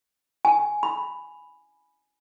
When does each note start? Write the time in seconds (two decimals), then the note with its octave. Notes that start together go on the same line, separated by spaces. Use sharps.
0.45 G#5
0.83 B5